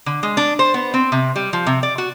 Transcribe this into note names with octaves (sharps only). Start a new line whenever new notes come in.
D3
G#3
D4
C5
B3
C4
C3
G3
F3
C3
D5
F#4